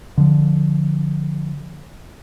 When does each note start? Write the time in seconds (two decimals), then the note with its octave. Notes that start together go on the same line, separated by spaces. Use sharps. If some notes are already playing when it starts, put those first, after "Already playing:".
0.17 D3 F3